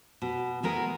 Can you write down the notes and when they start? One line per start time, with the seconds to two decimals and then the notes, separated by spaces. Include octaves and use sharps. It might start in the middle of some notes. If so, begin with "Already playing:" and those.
0.22 B2
0.63 E3 G#3 B3 A#4